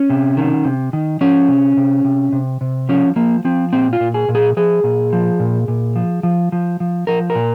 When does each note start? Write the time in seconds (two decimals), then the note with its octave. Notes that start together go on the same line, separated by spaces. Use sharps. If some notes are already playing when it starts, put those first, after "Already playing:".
Already playing: C#4
0.10 C3
0.37 D#3
0.65 C3
0.93 D#3
1.21 F3 C#4
1.48 C3
1.77 C3
2.05 C3
2.33 C3
2.61 C3
2.89 F3 C#4
3.16 F3 A#3
3.45 F3 C4
3.73 A#2 C4
3.93 F4
4.00 A#2
4.14 G#4
4.29 A#2
4.35 G#4
4.57 F3 G#4
4.84 A#2
5.13 F3
5.40 A#2
5.68 A#2
5.96 F3
6.23 F3
6.52 F3
6.80 F3
7.07 F3 A#4
7.30 A#4
7.35 A#2